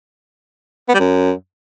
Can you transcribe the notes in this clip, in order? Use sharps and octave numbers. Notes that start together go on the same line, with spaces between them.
B3
G3
F#2